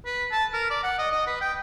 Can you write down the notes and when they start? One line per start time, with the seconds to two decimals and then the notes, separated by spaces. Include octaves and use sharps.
0.06 B4
0.31 A5
0.53 A#4
0.70 D5
0.84 F#5
0.98 D#5
1.12 D#5
1.27 B4
1.41 G5